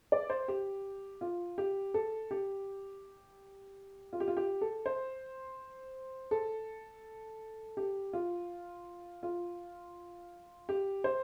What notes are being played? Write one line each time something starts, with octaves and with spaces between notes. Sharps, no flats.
D5
C5
G4
F4
G4
A4
G4
F4
G4
F4
G4
A4
C5
A4
G4
F4
F4
G4
C5